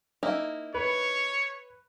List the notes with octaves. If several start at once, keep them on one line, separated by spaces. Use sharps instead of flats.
A#3 D#4 E4
B4 C#5